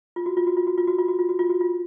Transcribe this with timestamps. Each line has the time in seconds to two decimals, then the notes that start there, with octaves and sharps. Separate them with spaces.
0.16 F4
0.26 F#4
0.37 F4
0.47 F#4
0.57 F4
0.67 F#4
0.77 F4
0.88 F#4
0.98 F4
1.08 F#4
1.19 F4
1.29 F#4
1.39 F4
1.49 F#4
1.61 F4